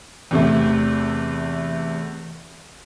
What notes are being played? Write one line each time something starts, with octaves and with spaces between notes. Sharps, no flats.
E2 C3 A3